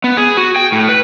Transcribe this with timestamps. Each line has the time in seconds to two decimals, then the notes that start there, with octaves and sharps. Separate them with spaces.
0.04 B3
0.17 G#4
0.37 F#4
0.56 G5
0.72 A2
0.89 B4